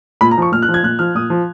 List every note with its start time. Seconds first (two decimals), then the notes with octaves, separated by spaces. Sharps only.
0.21 A#2 B5
0.31 A#5
0.38 F3 C#6
0.52 A#2 F6
0.62 F#6
0.69 F3
0.74 G#6
0.83 A#2 F#6
0.99 F3 F6
1.15 A#2 D#6
1.30 F3